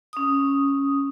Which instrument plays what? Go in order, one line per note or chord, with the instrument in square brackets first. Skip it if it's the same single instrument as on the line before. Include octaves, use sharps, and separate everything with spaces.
[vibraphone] C#4 D#6